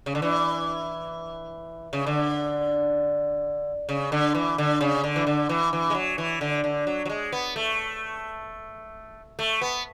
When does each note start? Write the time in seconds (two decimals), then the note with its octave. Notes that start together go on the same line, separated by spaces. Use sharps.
0.06 C#3
0.15 D3
0.22 E3
1.93 C#3
2.06 D3
3.89 C#3
4.12 D3
4.35 E3
4.58 D3
4.81 C#3
5.04 D3
5.16 E3
5.27 D3
5.49 E3
5.73 E3
5.90 G#3
5.95 F#3
6.18 E3
6.41 D3
6.64 D3
6.87 F#3
7.06 F#3
7.09 G#3
7.32 B3
7.56 A3
9.39 A3
9.61 B3